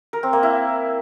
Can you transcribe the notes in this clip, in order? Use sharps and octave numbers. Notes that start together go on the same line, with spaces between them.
A#4
C4
A#3
E4